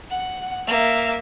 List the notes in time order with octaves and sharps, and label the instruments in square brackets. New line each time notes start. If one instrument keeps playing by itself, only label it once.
[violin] F#5
A#3 E5